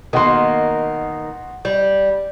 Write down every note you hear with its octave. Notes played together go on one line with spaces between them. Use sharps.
B2 D#3 A#3 F#4 C6
G3